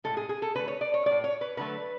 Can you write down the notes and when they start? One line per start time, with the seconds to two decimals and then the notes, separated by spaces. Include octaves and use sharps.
0.04 A2 E3 G#3 A4
0.17 G#4
0.29 G#4
0.42 A4
0.55 D3 A3 B4
0.68 C#5
0.81 D5
0.94 C#5
1.06 A2 G#3 D5
1.24 C#5
1.41 B4
1.57 D3 F#3 A3 B4